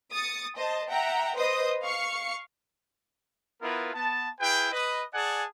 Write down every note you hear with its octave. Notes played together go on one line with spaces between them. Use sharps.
D#6 A6 C#7
C5 D#5 A5
E5 F#5 G5 A#5
B4 C5 D#5 D#6
F5 C#6 C7 C#7
B3 E4 F4 A#4 B4
B3 A5
E4 G#4 B4 G5
B4 D#5
G#4 D5 F#5 G#5 A5